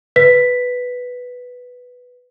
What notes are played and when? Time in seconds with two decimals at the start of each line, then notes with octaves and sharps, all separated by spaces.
0.16 B4 B6